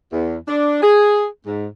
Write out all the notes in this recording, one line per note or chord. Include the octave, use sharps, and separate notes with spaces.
E2
D4
G#4
G#2